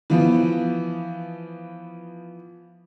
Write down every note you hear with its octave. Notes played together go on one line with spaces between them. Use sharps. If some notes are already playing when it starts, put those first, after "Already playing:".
E3 F3 B3